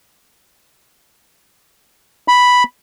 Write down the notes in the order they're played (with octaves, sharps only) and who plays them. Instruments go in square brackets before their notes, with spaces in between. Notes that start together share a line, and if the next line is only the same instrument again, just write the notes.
[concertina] B5